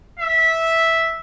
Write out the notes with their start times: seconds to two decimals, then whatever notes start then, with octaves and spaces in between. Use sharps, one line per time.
0.19 E5